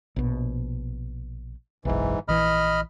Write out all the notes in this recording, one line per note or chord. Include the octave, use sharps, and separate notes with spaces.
A#1 B2
F#1 B1 G#2 E3
A#1 E3 D#5 B5 F6